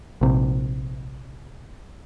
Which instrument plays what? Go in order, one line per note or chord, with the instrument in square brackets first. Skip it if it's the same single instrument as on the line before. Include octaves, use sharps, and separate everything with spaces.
[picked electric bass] A#1 C3